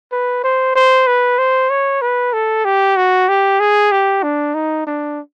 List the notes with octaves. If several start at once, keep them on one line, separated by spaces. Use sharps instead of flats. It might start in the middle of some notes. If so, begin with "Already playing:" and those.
B4
C5
C5
B4
C5
C#5
B4
A4
G4
F#4
G4
G#4
G4
D4
D#4
D4